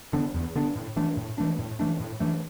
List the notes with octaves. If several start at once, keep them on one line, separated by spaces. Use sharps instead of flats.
D3 B3 D4
E2
D3 B3 D4
A2
E3 A3 D4
A2
E3 A3 D4
A2
E3 A3 D4
A2
E3 A3 D4